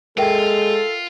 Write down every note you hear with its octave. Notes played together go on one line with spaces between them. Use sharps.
G#3 F4 A4 A#4 E5 G5